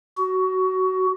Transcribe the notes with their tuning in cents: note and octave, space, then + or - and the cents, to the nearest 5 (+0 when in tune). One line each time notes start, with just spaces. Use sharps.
F#4 +20